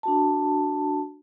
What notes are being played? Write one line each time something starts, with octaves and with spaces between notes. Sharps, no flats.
D4 F#4 A5